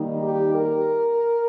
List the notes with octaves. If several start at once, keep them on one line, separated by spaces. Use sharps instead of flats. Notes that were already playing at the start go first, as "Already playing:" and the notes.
Already playing: D#3 G3 A#3 D#4
G4
A#4